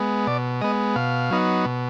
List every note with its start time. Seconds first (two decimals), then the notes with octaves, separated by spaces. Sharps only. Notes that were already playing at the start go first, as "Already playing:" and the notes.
Already playing: G#3 B3
0.27 B2 D5
0.61 G#3 B3 D#5
0.96 B2 F5
1.31 F#3 B3 D#4
1.65 B2